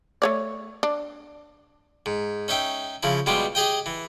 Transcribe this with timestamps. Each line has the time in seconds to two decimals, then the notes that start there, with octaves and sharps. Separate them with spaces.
0.22 A3 C#5 D5
0.83 D4
2.06 G#2
2.48 C#4 D#4 E5 G5
3.03 C#3 F3 E4
3.26 B2 G3 G#3 F4 G4
3.55 G4 G#4 D#5 G5
3.86 E3